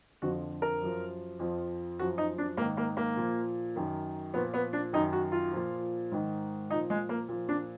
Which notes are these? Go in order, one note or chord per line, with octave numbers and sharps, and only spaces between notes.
F2 D3 F3 F#4
A#4
F#2 F3
F2 F3
F#2 F3 F#4
D#4
D4
G#2 D#3 A#3
A#3
A#3
A#2 F3
F#2 D#3
A#2 F3 B3
B3
D4
F#2 D#3 D#4
F#4
F4
A#2 F3
G#2 D#3
A#2 F3 D#4
G#3
A#3
A#2 F3
D4